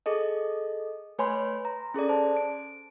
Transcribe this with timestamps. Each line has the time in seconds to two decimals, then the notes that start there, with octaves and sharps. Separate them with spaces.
0.06 G#4 A4 D#5
1.19 A3 B4 C#5 G#5 B5 C6
1.65 A#5
1.94 C#4 G#4 A4 D5
2.09 C5 A5
2.37 D7